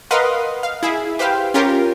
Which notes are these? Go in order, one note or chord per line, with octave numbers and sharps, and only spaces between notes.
A#4 B4 D#5 F5 F#5 C6
F5
E4 G#4
G4 B4 C5 F5 G5
C#4 F4 G4 A#4